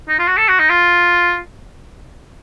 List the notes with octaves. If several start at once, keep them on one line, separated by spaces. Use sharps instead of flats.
D#4
F4
F#4
A4
F#4
D#4
F4